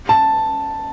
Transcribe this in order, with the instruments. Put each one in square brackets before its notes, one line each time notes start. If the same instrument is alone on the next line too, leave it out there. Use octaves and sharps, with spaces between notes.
[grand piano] A5